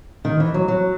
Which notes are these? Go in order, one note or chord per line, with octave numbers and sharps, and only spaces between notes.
D#3
E3
F#3
F#3